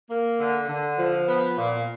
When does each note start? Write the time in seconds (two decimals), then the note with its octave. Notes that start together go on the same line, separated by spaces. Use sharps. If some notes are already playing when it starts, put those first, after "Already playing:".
0.10 A#3
0.39 D3
0.69 D3
0.98 F3
1.28 B3
1.58 A#2